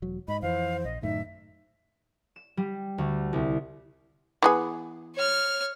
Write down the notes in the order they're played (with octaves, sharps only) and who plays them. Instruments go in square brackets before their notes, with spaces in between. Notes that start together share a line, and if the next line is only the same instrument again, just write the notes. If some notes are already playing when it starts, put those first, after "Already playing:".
[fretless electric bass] E1 F#3
[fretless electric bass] G#2 [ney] D#5 [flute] B5
[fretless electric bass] F2 E3 [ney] C5 [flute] F5
[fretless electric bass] A#1 [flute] D#5
[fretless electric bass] F#2 A2 D#3 [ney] D#4 [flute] E5
[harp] E7
G3
D2
C2
[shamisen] E3 B3 G#4
[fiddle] C#5 F6